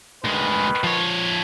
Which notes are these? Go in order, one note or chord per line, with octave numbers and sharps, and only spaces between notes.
D2 D#3 G#3 B4
F3 C#5